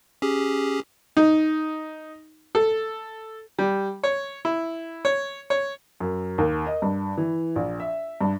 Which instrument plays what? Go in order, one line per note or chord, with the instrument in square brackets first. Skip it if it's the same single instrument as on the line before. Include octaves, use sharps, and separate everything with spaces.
[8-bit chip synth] C#4 G4 G#4
[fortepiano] D#4
A4
G3
C#5
E4
C#5
C#5
[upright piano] F#2
D#2
D#5
G2
E3
A#1
E5
G2